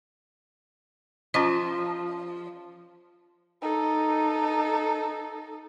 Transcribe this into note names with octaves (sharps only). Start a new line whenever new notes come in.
F3 C#4 F4 D#5
D#4 A4